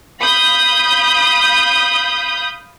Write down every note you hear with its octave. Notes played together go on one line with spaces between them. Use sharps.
F5 B5 D#6 G6